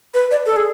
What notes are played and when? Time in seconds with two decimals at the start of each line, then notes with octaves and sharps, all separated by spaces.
0.14 B4
0.31 D5
0.46 A4
0.56 G#4